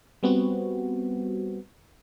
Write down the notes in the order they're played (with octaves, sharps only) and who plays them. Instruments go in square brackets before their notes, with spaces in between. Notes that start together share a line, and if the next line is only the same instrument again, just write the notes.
[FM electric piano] G3 B3 C4 F#4